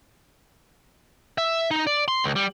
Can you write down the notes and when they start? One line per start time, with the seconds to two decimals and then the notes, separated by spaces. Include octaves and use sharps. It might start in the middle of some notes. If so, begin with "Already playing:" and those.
1.38 E5
1.71 D#4
1.87 D5
2.08 C6
2.24 C#2
2.36 G3